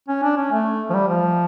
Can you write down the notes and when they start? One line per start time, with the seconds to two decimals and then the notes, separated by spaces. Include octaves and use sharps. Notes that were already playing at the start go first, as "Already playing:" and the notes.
0.08 C#4
0.23 D4
0.37 C#4
0.52 A3
0.90 F3
0.94 G3
1.08 F3